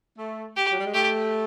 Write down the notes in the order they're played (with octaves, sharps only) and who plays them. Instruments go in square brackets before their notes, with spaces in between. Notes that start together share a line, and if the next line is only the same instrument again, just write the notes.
[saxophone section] A3
[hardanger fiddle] G4
[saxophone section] F#3
G3
G#3
[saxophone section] A3 [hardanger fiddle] G4